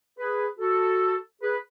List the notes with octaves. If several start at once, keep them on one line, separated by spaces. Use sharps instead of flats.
G#4 B4
F#4 A4
G#4 B4